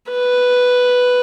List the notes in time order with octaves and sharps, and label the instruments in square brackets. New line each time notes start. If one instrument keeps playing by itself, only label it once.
[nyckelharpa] B4